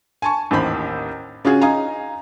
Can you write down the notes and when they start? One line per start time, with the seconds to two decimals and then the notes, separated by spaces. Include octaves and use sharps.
0.22 G#5 A5 C#6
0.51 A1 D#2 D#3 C5 B5
1.45 C#3 C#4 F4 F#4 G#4
1.61 D#4 F5 G#5 A#5